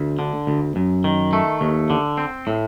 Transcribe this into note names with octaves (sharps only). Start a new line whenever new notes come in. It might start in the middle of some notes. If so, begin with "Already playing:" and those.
Already playing: D2
D3
D2
F#2
D#3
A3
D#2
D3
C4
A2